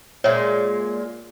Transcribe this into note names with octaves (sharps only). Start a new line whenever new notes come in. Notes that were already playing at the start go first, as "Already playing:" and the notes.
A#2 G#3 C#5 E5